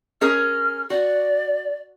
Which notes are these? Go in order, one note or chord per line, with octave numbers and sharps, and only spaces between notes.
C#4 G#4 A#4 F6
F#4 D5